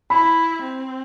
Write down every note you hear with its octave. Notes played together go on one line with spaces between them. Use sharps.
E4 B5
C4